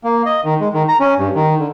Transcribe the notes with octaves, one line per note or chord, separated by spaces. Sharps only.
A#3
D#5
D#3
G#3
D#3
A#5
C#4
G2
D#3
D3